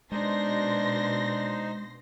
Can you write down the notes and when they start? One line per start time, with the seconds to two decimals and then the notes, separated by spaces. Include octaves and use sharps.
0.12 B2 G#3 D4 D#4 C5 C6 A#6